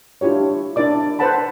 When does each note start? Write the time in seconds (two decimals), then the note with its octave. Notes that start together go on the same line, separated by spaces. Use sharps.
0.21 D4 E4 F4 G4 C#5
0.76 D4 E4 A#4 D5 D6
1.19 B4 C5 F#5 A5 B5